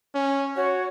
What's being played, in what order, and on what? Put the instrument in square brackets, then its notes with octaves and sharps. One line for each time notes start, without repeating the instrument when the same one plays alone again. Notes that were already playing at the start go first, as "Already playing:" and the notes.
[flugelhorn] C#4
[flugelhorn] F#4 [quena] C#5